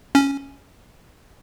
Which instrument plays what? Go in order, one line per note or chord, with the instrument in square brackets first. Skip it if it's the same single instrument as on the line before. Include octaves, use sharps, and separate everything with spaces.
[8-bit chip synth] C#4